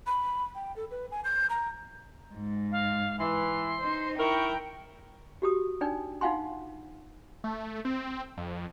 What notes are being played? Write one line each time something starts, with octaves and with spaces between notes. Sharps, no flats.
B5
G5
A4
B4
G#5
G6
A#5
G#2
F5
E3 C6
D#4 C5
E4 A#4 G5 C#6
F#4 G4 D#6
D4 D#4 D5 G5
D#4 F4 F5 F#5 G#5 C6
A3
C4
F2